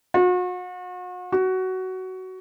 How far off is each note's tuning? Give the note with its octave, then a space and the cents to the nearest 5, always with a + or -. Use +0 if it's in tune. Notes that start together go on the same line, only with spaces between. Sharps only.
F#4 -40
F#4 +15